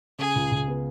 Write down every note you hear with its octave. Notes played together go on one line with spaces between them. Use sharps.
C#3 G#4
C#2
C#2
B3